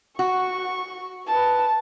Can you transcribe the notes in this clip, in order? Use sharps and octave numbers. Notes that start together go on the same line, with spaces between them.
F#4 C#6
B4 A5